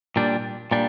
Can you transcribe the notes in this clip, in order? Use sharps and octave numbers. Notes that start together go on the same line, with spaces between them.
A#2 G3 D4
A#2 G3 D4